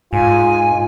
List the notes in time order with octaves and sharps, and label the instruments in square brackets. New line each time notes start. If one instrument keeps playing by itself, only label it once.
[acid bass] G#2 [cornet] F4 [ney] G#5